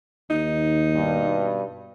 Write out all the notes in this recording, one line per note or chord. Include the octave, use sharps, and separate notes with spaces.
D#2 D#4
G2 B2